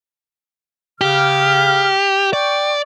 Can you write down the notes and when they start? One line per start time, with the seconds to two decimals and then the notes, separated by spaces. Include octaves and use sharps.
1.01 C#3 G4 F6
2.33 D5 G5 C#6